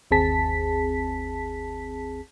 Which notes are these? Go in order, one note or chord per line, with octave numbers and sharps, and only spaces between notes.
G1 D#2 C4 G#4 A5 B6